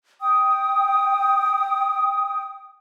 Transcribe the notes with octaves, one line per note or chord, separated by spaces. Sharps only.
G5 D#6